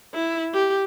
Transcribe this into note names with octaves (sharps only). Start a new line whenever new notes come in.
E4
G4